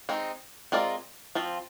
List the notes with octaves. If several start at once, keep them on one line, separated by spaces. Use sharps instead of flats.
G#3 C4 D#4
G#3 C4 F4 A#4 D5
F3 C4 F4